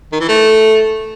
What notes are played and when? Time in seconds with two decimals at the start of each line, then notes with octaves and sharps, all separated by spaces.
0.12 D#3
0.20 E3
0.28 A3